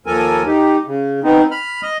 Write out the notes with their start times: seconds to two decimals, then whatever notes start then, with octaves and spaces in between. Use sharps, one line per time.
0.06 D#2 F3 A4 A#4 G#5
0.46 D#4 G4
0.87 C#3
1.24 B3 C4 D#4
1.51 B5 F6
1.82 D#5